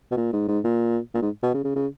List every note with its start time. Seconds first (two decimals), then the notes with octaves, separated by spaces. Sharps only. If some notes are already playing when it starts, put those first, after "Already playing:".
0.11 B2
0.17 A#2
0.33 G#2
0.48 G#2
0.64 A#2
1.15 A#2
1.22 G#2
1.43 B2
1.54 C#3
1.65 C#3
1.76 C#3